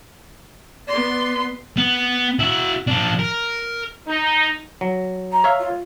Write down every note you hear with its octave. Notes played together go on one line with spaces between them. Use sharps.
B3 D5 C6
B3
E4 F#4
F3 D4
A#4
D#4
F#3
A#5
C#5 E5 F5
F4